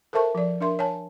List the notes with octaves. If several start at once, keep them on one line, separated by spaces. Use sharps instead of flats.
A4 A#4 C5 E5 A5 C#6
F3 D5
D4 A#4 E5 C6
C#5 G#5 A5